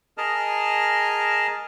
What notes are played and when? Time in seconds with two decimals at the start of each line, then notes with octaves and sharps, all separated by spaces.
0.18 G#4 A#4 D#5 A5 F6